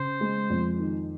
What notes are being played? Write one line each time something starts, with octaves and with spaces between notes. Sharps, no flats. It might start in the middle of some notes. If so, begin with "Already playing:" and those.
Already playing: C#3 C5
G#3
F2
D#3